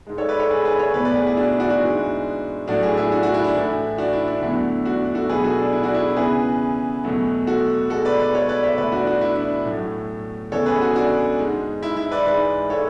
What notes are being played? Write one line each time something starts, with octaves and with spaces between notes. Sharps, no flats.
G#2 G#3
A4 C#5
B4 D5
A4 C#5
G#4 B4
G#4 B4
A4 C#5
E2 B2 A3 B4 D5
B4 D5
G#4 B4
E4 G#4
D4 F#4
D4 F#4
D4 F#4
G#2 E3 G#3
A2 F#3 A3 D4 F#4
E4 G#4
E4 G#4
D4 F#4
D4 F#4
E4
D4
A2 E3 A3 E4
D4 F#4
E4
D4
E2 D3 F#3 A3 E4
D4 F#4
F#4 A4
B2 F#3 A3 G#4 B4
F#4 A4
D4
E4
D4 F#4
E4 G#4
E2 C#3 E3 G#4 B4
E2 B2 F#3 A3
F#4 A4
B2 G#3 F#4 A4
B4 D5
B4 D5
A4 C#5
B4 D5
C#5 E5
E2 B2 A3 B4 D5
D4 F#4
D4 F#4
E4
D4
A2 F#3 A3
E2 C#3 E3 G#3 A4 C#5
G#4 B4
F#4 A4
D4 F#4
G#2 G#3
E4
E4
B4 D5
G#2 E3 G#3 B4 D5
A4 C#5